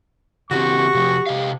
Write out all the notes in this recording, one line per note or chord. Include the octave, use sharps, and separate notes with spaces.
C#3 E3 C4 F#4 G4 C#6
C3 F3
C3 D#5 F5